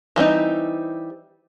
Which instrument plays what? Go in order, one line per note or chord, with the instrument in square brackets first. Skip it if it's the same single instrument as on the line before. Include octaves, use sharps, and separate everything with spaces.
[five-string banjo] E3 G3 C4 D#4